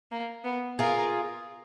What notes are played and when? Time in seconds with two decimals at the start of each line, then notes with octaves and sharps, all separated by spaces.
0.11 A#3
0.45 B3
0.79 F4 G#4 A#4